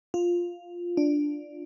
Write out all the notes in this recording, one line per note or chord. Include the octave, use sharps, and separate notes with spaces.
F4
D4